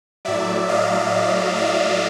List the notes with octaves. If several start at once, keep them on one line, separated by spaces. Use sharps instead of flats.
A2 F#3 D5 E5
D#5 F5
D5 E5